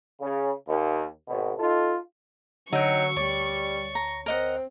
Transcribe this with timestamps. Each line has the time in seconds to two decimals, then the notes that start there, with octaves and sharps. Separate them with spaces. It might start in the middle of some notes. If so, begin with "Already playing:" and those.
0.20 C#3
0.67 D#2
1.28 G#1 B2
1.58 D#4 F4 A4
2.73 D3 F#3 D#4 F#4 G5 C#6 E6
3.16 D2 G3 C#5 D5
3.95 A#5
4.26 C4 A#4 D#5 F#5